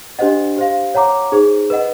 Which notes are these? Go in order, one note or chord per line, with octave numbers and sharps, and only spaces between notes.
D4 G4 C5 D#5 F#5
G4 C5 F5
C#5 F#5 A#5 D6
D#4 G#4 C5
B4 D#5 F#5